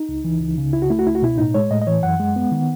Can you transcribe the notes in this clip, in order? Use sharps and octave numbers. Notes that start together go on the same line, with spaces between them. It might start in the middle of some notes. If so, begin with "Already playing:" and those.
Already playing: D#4
C#2
E3
C#2
C#3
C#2 E4
F#4
A3 E4
F#4
C#2 E4
F#4
B2 E4
A2 D#4
G#3 C#5
A2 D#5
D#5
E3 C#5
F#2 F#5
G#3
B3
D#3